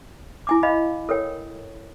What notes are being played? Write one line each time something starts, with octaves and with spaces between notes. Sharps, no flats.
E4 G#5 D6
D#5 F5 B5
A4 A#4 C#5 G5